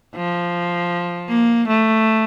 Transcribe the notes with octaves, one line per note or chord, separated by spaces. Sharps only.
F3
A#3
A3